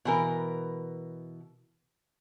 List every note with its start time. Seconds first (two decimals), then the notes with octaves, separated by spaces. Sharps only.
0.05 B2 E3 A#4